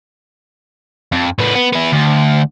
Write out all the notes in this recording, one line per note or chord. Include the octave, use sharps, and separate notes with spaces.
F2
A2 B3
B3
B3 E4
D2